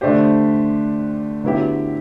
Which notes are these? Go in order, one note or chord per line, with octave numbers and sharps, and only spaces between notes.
D3 A3 D4 G4 C5
D3 F#3 B3 E4 G4